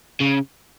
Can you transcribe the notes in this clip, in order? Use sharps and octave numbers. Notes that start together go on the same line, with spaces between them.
C#3